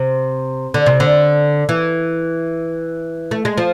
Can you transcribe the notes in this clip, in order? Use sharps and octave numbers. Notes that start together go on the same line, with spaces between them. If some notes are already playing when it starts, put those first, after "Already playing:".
Already playing: C3
D3
C3
D3
E3
A3
G#3
F3